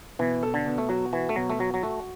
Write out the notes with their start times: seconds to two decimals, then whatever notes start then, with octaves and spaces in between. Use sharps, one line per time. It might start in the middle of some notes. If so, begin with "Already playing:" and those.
0.19 B2 E3
0.43 A4
0.54 D3
0.66 B2
0.78 A3
0.89 F#3 F#4
1.13 E3 F#4
1.29 A3
1.36 B2 F#3
1.50 A3
1.59 F#3 F#4
1.74 F#3
1.83 A3 F#4